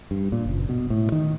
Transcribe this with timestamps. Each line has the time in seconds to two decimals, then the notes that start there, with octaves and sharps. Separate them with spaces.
0.11 G2
0.32 A#2
0.45 F#1
0.69 B2
0.90 A2
1.12 D#3